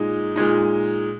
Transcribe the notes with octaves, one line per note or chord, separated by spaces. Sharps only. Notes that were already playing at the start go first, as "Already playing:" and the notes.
Already playing: A#2 G#3 D#4
A#2 G#3 D#4